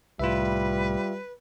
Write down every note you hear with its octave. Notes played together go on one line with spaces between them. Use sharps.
C2 A2 G3 F4 B4 E5